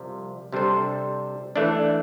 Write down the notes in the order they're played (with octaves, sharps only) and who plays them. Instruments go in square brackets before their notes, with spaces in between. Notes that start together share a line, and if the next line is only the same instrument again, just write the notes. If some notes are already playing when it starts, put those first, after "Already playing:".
Already playing: [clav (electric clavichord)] C2 C3 F3
C3 G3 D4 A4 C5
E3 A3 D4